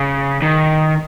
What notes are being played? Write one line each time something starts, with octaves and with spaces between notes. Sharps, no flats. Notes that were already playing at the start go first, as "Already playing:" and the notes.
Already playing: C#3
D#3